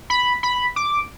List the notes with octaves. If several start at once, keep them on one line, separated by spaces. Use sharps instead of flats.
B5
B5
D6